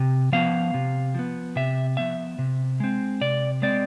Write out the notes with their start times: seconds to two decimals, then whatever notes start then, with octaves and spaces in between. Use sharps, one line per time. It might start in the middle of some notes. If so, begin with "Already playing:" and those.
Already playing: C3
0.32 F3 B3 F5
0.74 C3
1.14 F3 B3
1.56 C3 E5
1.97 F3 B3 E5
2.39 C3
2.80 G#3 C4
3.21 C3 D5
3.62 G#3 C4 D5